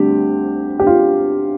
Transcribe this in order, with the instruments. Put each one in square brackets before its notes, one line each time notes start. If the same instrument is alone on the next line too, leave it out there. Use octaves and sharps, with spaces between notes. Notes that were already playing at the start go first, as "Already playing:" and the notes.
Already playing: [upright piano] D2 D3 G3 C4 G4
G4
F4